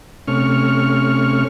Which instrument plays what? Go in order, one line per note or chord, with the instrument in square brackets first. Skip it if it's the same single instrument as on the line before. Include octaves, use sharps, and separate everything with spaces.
[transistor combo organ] C3 A3 C#4 C#6 F6